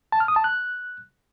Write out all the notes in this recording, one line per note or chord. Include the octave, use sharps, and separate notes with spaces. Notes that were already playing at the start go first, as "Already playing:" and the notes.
A5
F6
D#6
A5
F#6